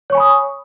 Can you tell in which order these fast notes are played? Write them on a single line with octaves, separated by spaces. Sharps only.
C#5 C#6 G#5 B5 D#6